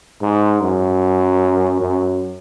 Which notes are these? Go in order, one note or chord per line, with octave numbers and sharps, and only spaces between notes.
G#2
F#2
F#2